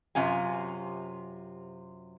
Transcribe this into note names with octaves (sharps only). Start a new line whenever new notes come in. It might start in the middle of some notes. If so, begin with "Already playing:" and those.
F#2 C3 F4 G#5